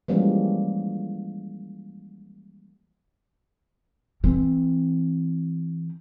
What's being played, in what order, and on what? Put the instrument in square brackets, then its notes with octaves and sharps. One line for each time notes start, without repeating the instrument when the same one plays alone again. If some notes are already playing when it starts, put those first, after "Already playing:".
[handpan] E3 F3 G3 G#3 A#3 C#4
[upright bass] E3 C4